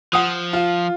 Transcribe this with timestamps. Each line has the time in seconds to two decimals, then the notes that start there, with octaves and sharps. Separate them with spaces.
0.13 F3 F#5 D#6
0.53 F4